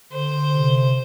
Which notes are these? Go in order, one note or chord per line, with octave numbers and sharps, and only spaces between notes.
D3 C5
C3